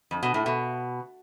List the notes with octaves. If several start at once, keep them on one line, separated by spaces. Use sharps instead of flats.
F2
B2
A2
B2